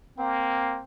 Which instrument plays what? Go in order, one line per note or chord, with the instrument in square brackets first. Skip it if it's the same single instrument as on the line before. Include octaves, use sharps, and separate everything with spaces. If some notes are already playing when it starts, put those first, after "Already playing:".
[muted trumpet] A#3 [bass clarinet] C4